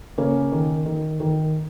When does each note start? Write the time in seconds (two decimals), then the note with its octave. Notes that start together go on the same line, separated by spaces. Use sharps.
0.18 C#3 A#3 C#4
0.52 D#3
0.86 D#3
1.20 D#3